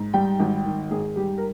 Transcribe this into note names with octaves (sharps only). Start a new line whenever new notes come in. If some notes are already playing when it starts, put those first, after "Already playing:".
Already playing: G#2
G3 G5
G#1
D#3
G#2 G#4
G3 G4
A#4